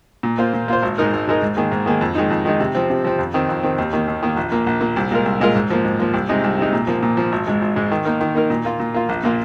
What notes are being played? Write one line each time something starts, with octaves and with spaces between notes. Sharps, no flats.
A#2
A#3 F4 C5
A#2
A#3 F4 C5
G#1
G#2 G#3 D#4 A#4
G#1
G#2 G#3 D#4 A#4
G#2
D#3 A#3 G#4
G#2
D#3 A#3 G#4
F2
D#3 G#3 D#4
F2
D#3 G#3 D#4
C3
F3 C4
C3
F3 C4
F2
D#3 C4
F2
D#3 C4
D#2
D#3 A#3
D#2
D#3 A#3
A#1
A#2 A#3
A#1
A#2 A#3
C2
A#2 G#3 F4 A#4
C2
A#2 G#3 F4 A#4
G#2
F3 A#3
G#2
F3 A#3
C2
C3 G#3 D#4
C2
C3 G#3 D#4
A#2
F3 A#3
A#2
F3 A#3
G#1
G#2 G#3
G#1
G#2 G#3
D#3
A#3 D#4 A#4
D#3
A#3 D#4 A#4
A#2
A#3 F4
A#2
A#3 F4
A#1
A#2 A#3 F4